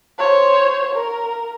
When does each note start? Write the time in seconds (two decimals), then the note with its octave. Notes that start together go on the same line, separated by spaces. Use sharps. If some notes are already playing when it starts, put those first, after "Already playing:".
0.19 C5 C#5
0.93 A#4